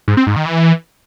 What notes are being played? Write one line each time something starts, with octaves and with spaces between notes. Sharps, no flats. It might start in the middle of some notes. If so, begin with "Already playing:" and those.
G#2
C4
G#2
D#3
E3